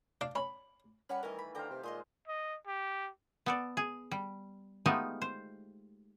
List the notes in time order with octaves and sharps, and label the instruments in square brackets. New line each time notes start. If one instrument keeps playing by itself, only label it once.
[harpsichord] D4 D5 F5
[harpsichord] C#4 [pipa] B5
[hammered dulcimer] G3 A#4 A#5 [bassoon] C#4 [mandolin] B4 F#5 C#6
[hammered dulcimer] D#3 E3 A3 [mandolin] C#4 D#5 [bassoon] A#4
[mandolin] B5
[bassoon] D3 [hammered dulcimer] G4 C5 F5 [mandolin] G5 A#5
[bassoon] C3
[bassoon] A#2 [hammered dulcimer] G#3 [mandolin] D#5 C6 D#6
[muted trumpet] D#5
G4
[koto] B3 A4 D5
G#4
G3
G#3 A3 B3 D#4 F4 G4
C5